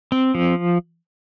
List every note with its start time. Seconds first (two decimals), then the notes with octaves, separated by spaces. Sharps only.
0.12 C4
0.35 F3